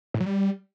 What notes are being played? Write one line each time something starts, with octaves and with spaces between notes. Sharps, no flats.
A2
F#3
G3